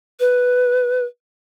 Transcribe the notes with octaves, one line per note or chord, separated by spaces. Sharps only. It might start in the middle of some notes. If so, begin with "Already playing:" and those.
B4